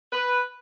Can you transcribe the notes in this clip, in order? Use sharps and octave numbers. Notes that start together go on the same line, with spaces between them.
B4